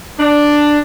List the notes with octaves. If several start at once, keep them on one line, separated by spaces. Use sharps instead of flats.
D4